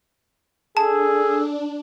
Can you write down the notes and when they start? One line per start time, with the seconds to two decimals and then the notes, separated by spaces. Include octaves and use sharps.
0.77 D4 G#4 A4 A5